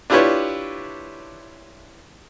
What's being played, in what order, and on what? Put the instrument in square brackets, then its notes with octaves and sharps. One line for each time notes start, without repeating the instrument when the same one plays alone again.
[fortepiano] D4 E4 F4 G4 B4 C#5